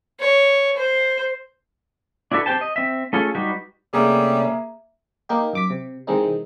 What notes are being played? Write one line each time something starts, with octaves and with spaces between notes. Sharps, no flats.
C#5
C5
D4 E4 F#4 A4 B4
C4 G4 C5 G5 A5
D#5
C4 E5
A3 C#4 F4 G#4 A4
G3 D#4 F#4 G4 B4
C3 G3 A3 A#3 C#4 G#4 E5 A#5
A#3 D#4 G4
F#2 D6 B6
C3
C3 D#3 E3 G#3 C4 D#4